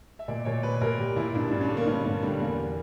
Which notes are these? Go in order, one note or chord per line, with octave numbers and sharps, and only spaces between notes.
E5
A#2 D5
A#2 C#5
A#2 B4
A#2 A#4
A#2 G4
A#2 E4
G2 D4
G2
C#4
D3
A#3
G2 B3
G2 A#3
D3 G3
E2 A#3